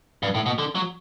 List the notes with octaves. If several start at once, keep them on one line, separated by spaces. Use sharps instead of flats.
G2
A2
B2
D3
F#3